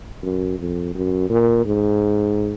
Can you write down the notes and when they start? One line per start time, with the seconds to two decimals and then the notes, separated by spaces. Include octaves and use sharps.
0.23 F#2
0.59 F2
0.95 F#2
1.30 A#2
1.65 G#2